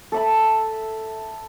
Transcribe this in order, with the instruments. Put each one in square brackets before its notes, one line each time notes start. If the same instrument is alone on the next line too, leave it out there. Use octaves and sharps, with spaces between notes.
[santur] A4 E5 B5